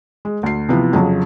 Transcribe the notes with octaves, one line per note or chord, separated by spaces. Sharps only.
G#3
D2 C7
C3 E3 F3 B3
F2 C#3 F#3